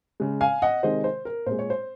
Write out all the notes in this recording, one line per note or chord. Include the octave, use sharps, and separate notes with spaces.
C#3 G#3
F5 G#5
D#5 F#5
C3 D#3 G#3 C5 D#5
C5
A#4
A#2 G#3 C5
C#5
C5